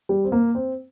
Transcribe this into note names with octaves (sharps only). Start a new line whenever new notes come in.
G3
C4
A#3
C4